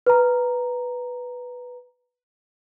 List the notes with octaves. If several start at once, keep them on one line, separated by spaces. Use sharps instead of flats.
B4 A#5